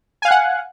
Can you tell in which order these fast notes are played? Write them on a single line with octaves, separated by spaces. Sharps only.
G#5 F5 F#6 F#5